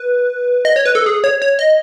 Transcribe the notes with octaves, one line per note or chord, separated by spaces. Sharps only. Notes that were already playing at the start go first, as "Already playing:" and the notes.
Already playing: B4
D#5
C#5
B4
A4
G#4
C#5
C#5
D#5